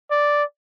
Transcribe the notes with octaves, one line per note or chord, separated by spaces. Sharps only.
D5